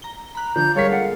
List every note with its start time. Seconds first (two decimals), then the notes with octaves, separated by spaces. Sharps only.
0.02 A#5 G7
0.35 A#5 B5 F#6
0.56 D3 F3 D4 G6
0.76 G3 G#3 A4 A#4 C#5 F5 B6
0.91 A#3 F4 A4 F#5